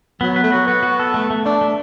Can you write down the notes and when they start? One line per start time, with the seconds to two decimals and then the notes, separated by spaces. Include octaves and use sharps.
0.21 F#3 B3
0.36 B4
0.43 A3
0.52 F#3 F#4
0.67 B3 F#4
0.83 F#4
0.99 A4
1.14 A3
1.30 A3
1.46 A3 D4
1.61 A3